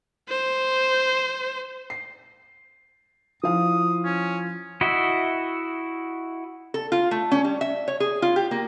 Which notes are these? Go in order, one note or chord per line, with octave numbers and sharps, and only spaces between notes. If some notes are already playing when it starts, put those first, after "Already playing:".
C5
C7
F3 E4 F5 D#6
C#4
E4 F#4 D#5 E5
A4
F4
A3
C#4
G3
E5
C#5
G#4
F4
G4
A#3